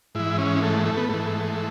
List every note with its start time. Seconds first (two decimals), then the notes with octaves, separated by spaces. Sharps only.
0.15 G#2 E3 E4
0.38 C#4
0.63 A3
0.86 A3
0.97 B3
1.09 G#2 E3 A3